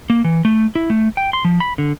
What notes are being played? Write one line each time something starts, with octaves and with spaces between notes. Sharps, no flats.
A#3
E3
A3
E4
A3
G5
C6
F3
B5
D3